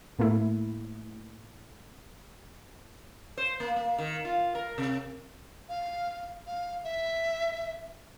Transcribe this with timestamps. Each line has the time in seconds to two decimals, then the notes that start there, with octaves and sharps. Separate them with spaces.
0.19 A2 A3 A#3 E4
3.37 C5
3.60 A#3
3.76 A#3
3.98 D#3
4.25 F4
4.55 A#4
4.78 C3
5.69 F5
6.47 F5
6.84 E5